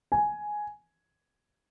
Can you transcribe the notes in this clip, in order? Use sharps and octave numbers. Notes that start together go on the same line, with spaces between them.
G#5